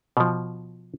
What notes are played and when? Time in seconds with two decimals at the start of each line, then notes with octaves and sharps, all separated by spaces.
0.17 B2 F3